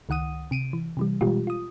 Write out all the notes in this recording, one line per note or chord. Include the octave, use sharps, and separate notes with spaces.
C#2 D#3 F#5 D#6 D#7
C3 D7 D#7
E3
C3 E3 G3
B2 E3 G3 G#3 F4 G4
F4 D#6